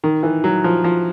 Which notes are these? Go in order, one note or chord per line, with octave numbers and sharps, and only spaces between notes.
D#3
E3
F#3
F3
F3